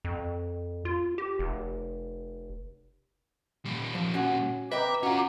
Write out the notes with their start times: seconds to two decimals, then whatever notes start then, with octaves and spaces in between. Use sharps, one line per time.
0.05 F2
0.85 F4
1.18 G4
1.39 F1
3.65 A#2 G3
3.95 F3
4.14 C#4 F#4
4.72 B4 D#5 E5 G5 A#5 D6
5.03 C#4 F4 F#4 A#4